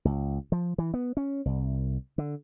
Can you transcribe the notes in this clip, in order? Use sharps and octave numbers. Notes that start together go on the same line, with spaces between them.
C#2
F3
E3
B3
C#4
C2
D3